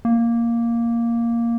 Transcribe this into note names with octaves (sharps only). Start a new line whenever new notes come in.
A#3